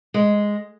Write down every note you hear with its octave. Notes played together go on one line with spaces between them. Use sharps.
G#3